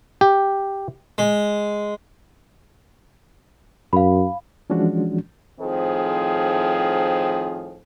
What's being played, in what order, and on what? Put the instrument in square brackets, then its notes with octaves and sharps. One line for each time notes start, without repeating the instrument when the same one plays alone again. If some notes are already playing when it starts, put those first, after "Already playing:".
[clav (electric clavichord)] G4
[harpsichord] G#3
[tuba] F#2 [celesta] F5 B5
[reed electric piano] E3 F3 G#3 C#4 D4 F#4
[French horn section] A2 D#3 F3 C4 G#4 C5